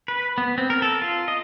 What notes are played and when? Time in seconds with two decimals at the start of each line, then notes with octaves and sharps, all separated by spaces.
0.08 B4
0.38 B3
0.58 C4
0.70 A#4
0.82 A4
1.01 F4
1.28 D#5